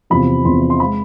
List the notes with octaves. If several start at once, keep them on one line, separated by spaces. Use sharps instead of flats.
E2 C3 F3 B5
E2 C3 F3 C6
C6
G#3 B5